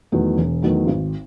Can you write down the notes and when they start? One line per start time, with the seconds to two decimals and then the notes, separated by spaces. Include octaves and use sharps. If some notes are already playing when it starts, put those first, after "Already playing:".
0.12 E2 D#3 F#3 A3
0.38 E1
0.62 E2 D#3 F#3 A3
0.87 G#1